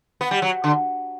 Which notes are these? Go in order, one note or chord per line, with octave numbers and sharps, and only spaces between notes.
B3
G3
F#3
D3